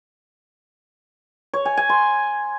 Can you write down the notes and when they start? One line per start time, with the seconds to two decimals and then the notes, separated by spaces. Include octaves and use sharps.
1.53 C#5
1.65 G#5
1.77 G#5
1.89 C6